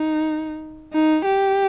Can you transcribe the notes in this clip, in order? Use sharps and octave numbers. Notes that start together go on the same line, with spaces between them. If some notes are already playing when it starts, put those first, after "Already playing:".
Already playing: D#4
D#4
G4